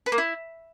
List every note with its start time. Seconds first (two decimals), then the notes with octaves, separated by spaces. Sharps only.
0.06 B4
0.12 A#3
0.18 E4